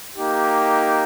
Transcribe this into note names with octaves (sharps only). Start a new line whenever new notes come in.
A#3 D#4 G4